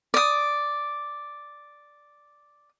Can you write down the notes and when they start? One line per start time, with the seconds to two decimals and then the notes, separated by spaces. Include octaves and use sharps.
0.14 D5 D#6